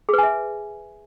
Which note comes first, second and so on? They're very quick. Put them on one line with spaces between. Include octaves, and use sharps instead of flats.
G#4 B4 G#5 E5